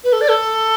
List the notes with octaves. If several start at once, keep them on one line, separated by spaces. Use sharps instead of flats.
B4
A4
D5
A4